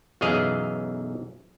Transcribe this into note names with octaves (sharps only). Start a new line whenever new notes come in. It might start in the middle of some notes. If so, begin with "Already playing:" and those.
B1 F#2 E3 G#4 D#5 F5